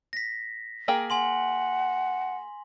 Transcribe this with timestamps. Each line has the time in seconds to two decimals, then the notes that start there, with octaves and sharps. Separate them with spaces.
0.13 A#6 B6
0.88 A#3 G#4 G5
1.10 F#5 G#5 C6 F#7